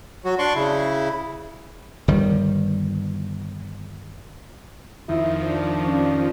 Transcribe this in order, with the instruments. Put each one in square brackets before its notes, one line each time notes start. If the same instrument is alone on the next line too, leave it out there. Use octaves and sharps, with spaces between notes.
[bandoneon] F#3 F#4
D4 D5 C6 C#6
C#3 E4
[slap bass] G1 D#3 G3
[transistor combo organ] F2 D#3 [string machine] F3 [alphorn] E4
[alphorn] D4
[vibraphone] C#4